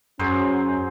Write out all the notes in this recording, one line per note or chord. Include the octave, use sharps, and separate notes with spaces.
F#2 F#3 C#4 G#4 C5